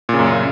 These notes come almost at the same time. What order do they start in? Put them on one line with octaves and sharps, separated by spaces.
A#2 C#3 F#2